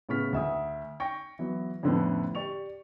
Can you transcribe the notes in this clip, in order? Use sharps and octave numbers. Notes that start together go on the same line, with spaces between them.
A2 C#3 B3 C#6 F6 B6
D2 E5 D#6
G5 C#6 A#6
E3 F#3 B3
F2 A2 D3 A3 B3 C#4
G4 D5 C#6 F7